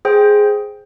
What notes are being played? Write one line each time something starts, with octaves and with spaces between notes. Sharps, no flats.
G#4 C5 G5